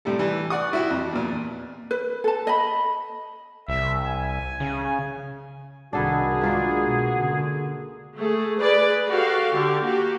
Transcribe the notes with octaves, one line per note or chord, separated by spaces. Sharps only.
A2 C3 G3 A4
E3 G3
D5 F#5 C#6 D#6
E4 F#4 G4
F2
E2 A#2
B4
A4 A5
D#5 B5
C2 E5
G#5
C#3
C2 D#3 D4 F#4 G#4 A4 B4
G#3 A#3 D4 F4 B4
B2
D3
A3 G#4
G#4 B4 D5
F#4 G4 A4 F5
D3 G4
A#3 F#4 G4